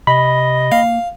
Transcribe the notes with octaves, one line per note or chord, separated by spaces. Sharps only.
C3 D#5 B5
A#3 F5